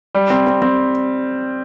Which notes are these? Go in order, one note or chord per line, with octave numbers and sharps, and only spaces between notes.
G3
C4
C4
C4